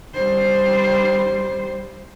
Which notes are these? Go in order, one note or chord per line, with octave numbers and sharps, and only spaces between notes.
G3 C5